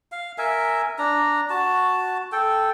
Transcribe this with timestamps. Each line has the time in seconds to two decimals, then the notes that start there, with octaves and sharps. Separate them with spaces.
0.12 F5
0.38 A#4 E5 G#5
0.99 D4 A#5
1.50 F#4 A5
2.32 A4 G5